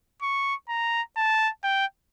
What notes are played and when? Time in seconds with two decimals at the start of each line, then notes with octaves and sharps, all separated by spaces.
0.22 C#6
0.69 A#5
1.17 A5
1.64 G5